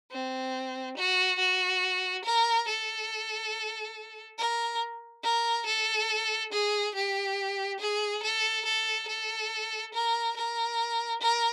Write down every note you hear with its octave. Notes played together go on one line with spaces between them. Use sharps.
C4
F#4
F#4
A#4
A4
A#4
A#4
A4
G#4
G4
G#4
A4
A4
A4
A#4
A#4
A#4